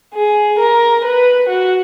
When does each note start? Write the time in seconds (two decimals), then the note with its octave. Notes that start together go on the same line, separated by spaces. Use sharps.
0.14 G#4
0.59 A#4
1.05 B4
1.50 F#4